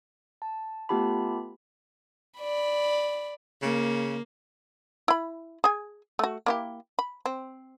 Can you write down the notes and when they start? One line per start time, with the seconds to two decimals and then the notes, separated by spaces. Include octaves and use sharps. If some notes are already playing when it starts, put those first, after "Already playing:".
0.42 A5
0.89 A3 B3 F4 G4 A5 B5
2.39 D5 B5
3.62 C#3 A#3
5.08 E4 B5
5.64 G#4 G#5
6.19 A3 F#4
6.46 A#3 E4 G4
6.99 B5
7.26 C4